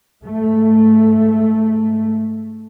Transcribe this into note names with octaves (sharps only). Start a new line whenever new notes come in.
G#2 A3